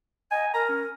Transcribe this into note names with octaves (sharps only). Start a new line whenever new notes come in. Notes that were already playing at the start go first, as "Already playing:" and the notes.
D#5 G#5
A#4 A#5
C#4